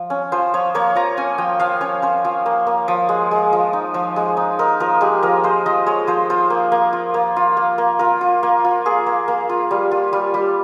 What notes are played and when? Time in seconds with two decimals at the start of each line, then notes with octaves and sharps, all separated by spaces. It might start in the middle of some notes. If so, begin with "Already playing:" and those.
Already playing: F3
0.10 C#4
0.32 F3 C5
0.54 F3 C#5
0.75 A#3 C#5
0.95 F3 A#5
1.17 C#4 G#5
1.38 F3 G5
1.59 F3 F5
1.81 C#4 C#5
2.02 C#4 C5
2.25 F3
2.46 A#3
2.67 A#3
2.88 F3
3.09 G#3
3.31 G#3
3.53 F3
3.73 D#4
3.94 F3
4.16 G#3
4.37 D#4
4.59 D#4 A#4
4.80 F3 A#4
5.01 G#3 G4
5.22 F3 A#4
5.44 G#3 C5
5.66 F3 D#5
5.86 G#3 C#5
6.07 F3 C5
6.30 F4 C5
6.50 A#3
6.72 A#3
6.93 F4
7.14 A#3
7.36 F4
7.57 A#3
7.78 A#3
7.99 F4 A#4
8.21 F4
8.43 A#3
8.64 F4
8.85 A#3 G#4
9.06 A#3
9.28 A#3
9.49 F4
9.71 G3
9.91 F4
10.13 G3
10.34 G3